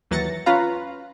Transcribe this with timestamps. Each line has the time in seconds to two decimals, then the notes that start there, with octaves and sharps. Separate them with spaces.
0.11 D#2 E3 F#3 A6 A#6 C#7
0.46 C#4 F4 B4 F5 A#5